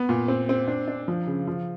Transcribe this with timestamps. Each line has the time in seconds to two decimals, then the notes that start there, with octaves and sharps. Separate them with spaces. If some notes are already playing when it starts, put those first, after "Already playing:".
Already playing: B3
0.09 A#2
0.28 C4
0.49 C4
0.68 D4
0.88 D4
1.08 F3
1.27 C#3
1.47 F3